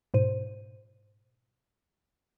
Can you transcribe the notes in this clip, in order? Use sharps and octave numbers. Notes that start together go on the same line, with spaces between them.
G#2 B2 C5 D#7